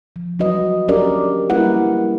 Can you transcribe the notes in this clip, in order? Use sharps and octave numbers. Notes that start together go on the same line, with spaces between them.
F3
F#3 G3 F#4 B4 D#5
C#4 D4 G4 A#4 D5
G3 A#3 E4 A#4 B4 F#5